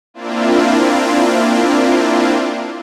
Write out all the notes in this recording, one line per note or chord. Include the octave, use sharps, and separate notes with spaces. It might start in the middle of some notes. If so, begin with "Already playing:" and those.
A#3 C4 D4 E4 F4